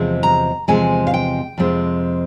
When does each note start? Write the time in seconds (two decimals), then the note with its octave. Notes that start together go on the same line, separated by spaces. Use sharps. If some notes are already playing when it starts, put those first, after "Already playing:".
Already playing: E2 C3 F3 G#3 C4
0.23 A#5
0.68 E2 C3 F3 G#3 C4 G#5
1.07 F5
1.14 G5
1.58 F2 C3 F3 G#3 C4